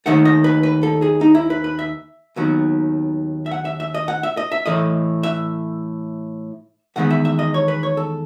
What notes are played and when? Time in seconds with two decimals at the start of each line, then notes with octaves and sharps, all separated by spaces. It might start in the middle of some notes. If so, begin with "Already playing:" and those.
0.06 D#2 D#3 A3 F#5
0.25 D#5
0.44 B4
0.63 B4
0.83 A4
1.02 G#4
1.21 D#4
1.35 E4
1.50 B4
1.64 B4
1.79 E5
2.36 D#2 D#3 F#3 B3
3.46 E5
3.51 F#5
3.65 E5
3.80 E5
3.94 D#5
4.08 F#5
4.23 E5
4.37 D#5
4.52 E5
4.66 A2 E3 A3 D#5
5.23 E5
6.96 E2 D#3 G#3 B3 F#5
7.10 E5
7.25 E5
7.39 D#5
7.54 C#5
7.68 B4
7.83 C#5
7.97 A4